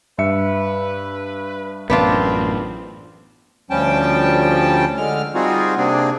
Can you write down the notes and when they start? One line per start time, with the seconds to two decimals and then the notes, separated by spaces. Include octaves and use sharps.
0.18 G2 B4 E5 C#7
1.90 A1 F#2 B3 C4 D4 F4
3.70 D2 F3 G3 C#4 G5 A5
4.97 D3 G#3 F6
5.35 G3 C4 D#4 F4 F#4 G#4
5.77 C3 A#3 C4 D4 G#4